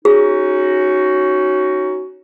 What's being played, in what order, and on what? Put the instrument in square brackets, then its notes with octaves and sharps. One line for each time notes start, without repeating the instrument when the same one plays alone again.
[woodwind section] C#4 D#4 F#4 [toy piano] G#4